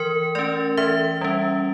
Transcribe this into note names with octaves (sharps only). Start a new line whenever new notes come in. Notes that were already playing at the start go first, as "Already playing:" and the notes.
Already playing: E3 A#4
A3 C#4 D5
E3 E5
G3 C#4